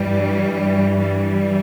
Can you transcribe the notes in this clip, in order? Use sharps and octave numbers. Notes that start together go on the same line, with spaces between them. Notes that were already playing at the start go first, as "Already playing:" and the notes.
Already playing: G2 E3 G3
G3